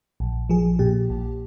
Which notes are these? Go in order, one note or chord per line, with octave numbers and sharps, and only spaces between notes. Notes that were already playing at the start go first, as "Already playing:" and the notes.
A#1
F3 G#4
A#2 G4
A#1